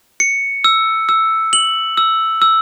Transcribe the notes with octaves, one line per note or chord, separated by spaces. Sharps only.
C#7
E6
E6
F#7
E6
E6